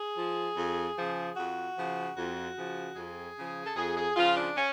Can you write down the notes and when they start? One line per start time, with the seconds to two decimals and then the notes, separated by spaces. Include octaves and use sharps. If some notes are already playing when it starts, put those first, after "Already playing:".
Already playing: G#4
0.17 F3
0.56 F2
0.97 C#3 F3
1.37 F2 F#4
1.77 C#3 F3
2.16 F2 F#4
2.56 C#3 F3
2.96 F2 G#4
3.37 C#3 F3
3.65 A4
3.76 F2 G#4
3.97 G#4
4.16 C#3 F3 F4
4.36 D4
4.56 C#4